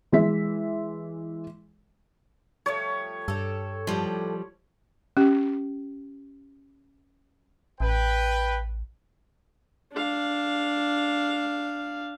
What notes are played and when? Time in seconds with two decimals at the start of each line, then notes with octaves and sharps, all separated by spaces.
0.12 E3 G#3 E5 B6
2.66 F3 G3 A3 C#5
3.28 G2 G3 A4
3.87 A2 F3 G3 D5
5.17 C#4 G4
7.80 A1 B4 G5
9.92 D4 F5